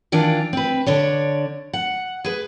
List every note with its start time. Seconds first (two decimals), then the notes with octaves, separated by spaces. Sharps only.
0.12 D#3 E3 D4 F4
0.53 C4 B4
0.86 D3 D4 C#5
1.73 F#5
2.24 G#4 B4